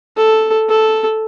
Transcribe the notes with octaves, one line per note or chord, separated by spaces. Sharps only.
A4
A4